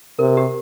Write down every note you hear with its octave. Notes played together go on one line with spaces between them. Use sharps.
C3 A#4
G4